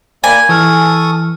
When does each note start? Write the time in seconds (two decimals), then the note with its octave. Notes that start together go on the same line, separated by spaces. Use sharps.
0.24 A#3 D5 G#5 B5
0.49 E3 A4 C#6 D#6 F6